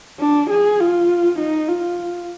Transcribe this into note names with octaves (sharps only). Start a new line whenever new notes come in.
D4
G#4
F4
D#4
F4